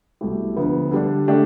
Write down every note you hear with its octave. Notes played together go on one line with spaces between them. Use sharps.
C2 B2 A3 E4 G4
D2 D3 F3 B3
D3 G3 D4
D3 A3 D4 G4